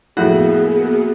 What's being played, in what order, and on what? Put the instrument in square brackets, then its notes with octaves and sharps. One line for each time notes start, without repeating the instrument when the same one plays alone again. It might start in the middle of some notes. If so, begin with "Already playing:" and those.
[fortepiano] F2 A2 [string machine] A#3 B3 [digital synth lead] F#4 [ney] G#4